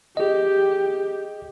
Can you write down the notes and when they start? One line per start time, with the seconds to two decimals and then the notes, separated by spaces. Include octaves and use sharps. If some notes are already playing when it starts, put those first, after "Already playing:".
0.17 G4 G#4 D#5